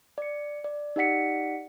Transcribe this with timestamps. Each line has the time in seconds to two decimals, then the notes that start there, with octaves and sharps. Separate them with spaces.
0.18 D5 C#7
0.64 D5
0.96 D#4 G4 D5 F#5 B6 C#7